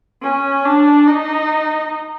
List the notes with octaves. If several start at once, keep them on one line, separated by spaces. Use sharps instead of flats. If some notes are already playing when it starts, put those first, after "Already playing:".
C#4
D4
D#4